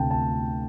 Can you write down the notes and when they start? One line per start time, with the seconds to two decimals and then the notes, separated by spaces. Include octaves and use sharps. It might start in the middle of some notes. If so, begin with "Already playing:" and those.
Already playing: D2 C3 A3 D4 G5 A5
0.11 A5